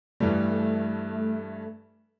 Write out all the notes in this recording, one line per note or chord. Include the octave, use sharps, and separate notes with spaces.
G2 E3 G3 A3